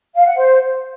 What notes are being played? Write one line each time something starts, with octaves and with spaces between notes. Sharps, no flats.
F5
F#5
C5